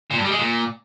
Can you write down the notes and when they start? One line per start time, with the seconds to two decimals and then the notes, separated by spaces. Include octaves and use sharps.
0.11 A#2
0.18 G2
0.25 G3
0.31 G#3
0.38 A#2